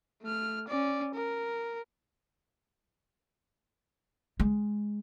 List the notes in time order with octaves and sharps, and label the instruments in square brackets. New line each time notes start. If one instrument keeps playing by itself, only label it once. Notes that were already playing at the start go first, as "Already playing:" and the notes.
[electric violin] A3 F6
C#4 D5
A#4
[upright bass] G#3